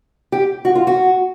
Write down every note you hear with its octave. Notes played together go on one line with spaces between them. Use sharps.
G4
F#4
F4
F#4